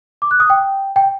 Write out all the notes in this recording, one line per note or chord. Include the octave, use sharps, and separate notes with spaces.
D6
F#6
D#6
G5
G5